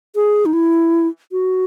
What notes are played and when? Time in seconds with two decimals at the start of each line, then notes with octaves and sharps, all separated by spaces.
0.15 G#4
0.46 D#4
0.53 E4
1.32 F#4